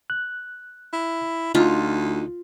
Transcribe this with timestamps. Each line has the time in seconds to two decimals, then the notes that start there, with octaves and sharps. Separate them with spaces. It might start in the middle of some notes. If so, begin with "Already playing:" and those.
0.10 F#6
0.93 E4
1.55 D2 D#4 F4